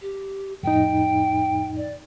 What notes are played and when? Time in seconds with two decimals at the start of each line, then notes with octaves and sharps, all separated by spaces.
0.01 G4
0.63 F2 A2 D#4 G5
1.77 D5